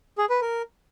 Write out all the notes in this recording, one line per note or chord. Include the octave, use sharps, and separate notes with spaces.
G#4
B4
A#4